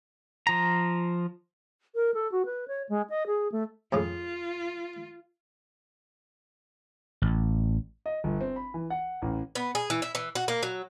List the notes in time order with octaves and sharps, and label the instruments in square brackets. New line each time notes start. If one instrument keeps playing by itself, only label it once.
[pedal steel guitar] F3 A#5
[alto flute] A#4
A4
F#4
B4
C#5
G#3
D#5
G#4
A3
[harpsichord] F2 A2 C#3 [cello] F4
[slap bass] A1
[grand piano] D#5
G1
C4
B5
E3
F#5
A1
[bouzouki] B3
G#4
E3
E4
E3
F#4
A#3
F#3